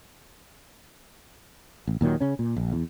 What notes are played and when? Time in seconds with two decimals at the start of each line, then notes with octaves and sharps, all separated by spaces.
1.87 A1
2.01 D#2 A#2 D#3 F#3
2.20 C#3 C#4
2.39 A#2
2.56 A#1
2.73 E2